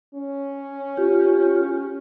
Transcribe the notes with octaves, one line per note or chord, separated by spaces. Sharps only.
C#4
F4 G4